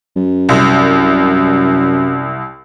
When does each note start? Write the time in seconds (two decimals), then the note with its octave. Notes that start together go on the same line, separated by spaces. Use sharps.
0.16 F#2
0.49 C2